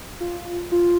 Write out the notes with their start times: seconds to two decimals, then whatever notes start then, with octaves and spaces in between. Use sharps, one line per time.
0.20 F4
0.72 F4